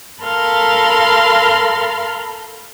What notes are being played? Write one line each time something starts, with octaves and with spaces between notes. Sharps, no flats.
A4 A#4 F5 B5 C6